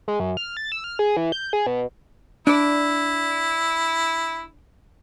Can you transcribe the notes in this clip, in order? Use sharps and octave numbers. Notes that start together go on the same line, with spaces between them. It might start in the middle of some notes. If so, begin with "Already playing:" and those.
G#3
F#2
F6
A6
E6
F6
G#4
E3
G6
G#4
B2
D4 E4 D5